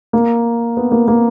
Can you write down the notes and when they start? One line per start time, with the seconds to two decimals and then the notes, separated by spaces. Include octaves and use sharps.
0.13 A#3
0.77 B3
0.92 A#3
1.08 A#3